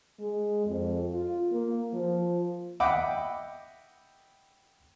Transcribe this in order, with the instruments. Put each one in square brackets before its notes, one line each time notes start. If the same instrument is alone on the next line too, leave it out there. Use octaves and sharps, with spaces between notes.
[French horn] G#3
F2
F4
A#3
F3
[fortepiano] D#5 E5 F#5 G5 B5 D6